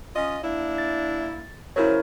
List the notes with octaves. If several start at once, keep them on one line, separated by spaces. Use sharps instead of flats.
C#4 F4 D#5
A#3 D4 E4
A6
C#3 F#3 E4 A#4 C5 C#5